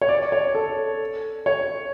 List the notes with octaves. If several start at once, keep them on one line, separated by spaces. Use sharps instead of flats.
C#5
D5
C#5
A4
C#5